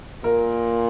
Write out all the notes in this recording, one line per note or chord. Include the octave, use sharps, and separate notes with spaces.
A#2 A#4